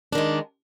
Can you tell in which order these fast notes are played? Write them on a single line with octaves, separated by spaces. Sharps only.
D4 D#3 G#3